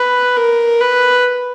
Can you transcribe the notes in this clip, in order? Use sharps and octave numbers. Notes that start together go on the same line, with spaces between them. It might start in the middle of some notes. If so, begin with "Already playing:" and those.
Already playing: B4
A#4
B4